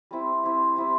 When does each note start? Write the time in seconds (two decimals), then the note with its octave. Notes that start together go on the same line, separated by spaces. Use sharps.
0.11 G3 C4 E4 G4
0.43 G3 C4 E4 G4
0.76 G3 C4 E4 G4